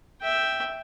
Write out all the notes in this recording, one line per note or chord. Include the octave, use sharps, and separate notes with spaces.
E5 G5